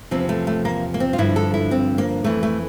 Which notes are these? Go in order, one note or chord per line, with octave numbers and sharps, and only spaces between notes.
E2 C3 F3 C4
A3
A3
A#3
A#3
C4
F4
G2 D3 F3 E4
A4
E4
C4
A#3
F2 E3 A3
A3